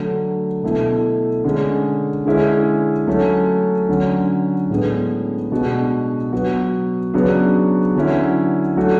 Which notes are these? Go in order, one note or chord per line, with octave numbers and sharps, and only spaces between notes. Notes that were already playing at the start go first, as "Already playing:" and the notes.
Already playing: D3 F#3 A3
B2 A3 E4
D3 G#3 C#4
D3 G#3 C#4 E4
F#3 A3 C#4
D3 F#3 C#4
A2 G#3 B3 D4
B2 G#3 D4 F#4
F#3 B3 F#4
C#3 F#3 B3 D4 F#4
D3 F#3 C#4 E4
F#3 A3 D4 F#4